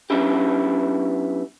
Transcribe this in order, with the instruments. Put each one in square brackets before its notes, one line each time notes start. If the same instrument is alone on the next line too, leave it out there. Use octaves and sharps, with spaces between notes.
[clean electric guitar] F#3 B3 C#4 D4 E4 G4